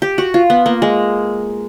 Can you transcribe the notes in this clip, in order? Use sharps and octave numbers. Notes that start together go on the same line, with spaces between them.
G4
F#4
F4
B3
A#3
G#3